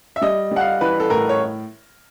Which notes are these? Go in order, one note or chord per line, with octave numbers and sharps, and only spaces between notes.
E5
G3 D#5
G3 F#5
F5
E3 B4
A4
A2 A#4
C#5